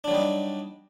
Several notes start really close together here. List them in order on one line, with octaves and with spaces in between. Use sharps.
D4 F#3 G3 D#4